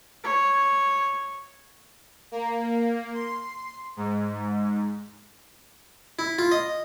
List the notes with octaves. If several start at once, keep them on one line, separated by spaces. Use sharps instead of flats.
C#5
A#3
C6
G#2
E4
F4
D#5